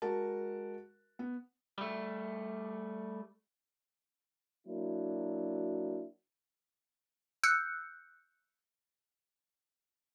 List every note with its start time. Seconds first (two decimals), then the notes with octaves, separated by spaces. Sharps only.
0.02 G#3 F#4 A#4 A5
1.19 B3
1.78 G3 A3
4.67 F#3 A#3 D4 E4 F#4
7.43 E6 F#6 G6 C#7